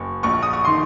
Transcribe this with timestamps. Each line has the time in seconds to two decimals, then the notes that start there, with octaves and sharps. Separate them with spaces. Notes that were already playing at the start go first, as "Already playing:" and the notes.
Already playing: F#1 C#6
0.23 A#1 C#6
0.43 D#6
0.53 C#6
0.65 D#3 C6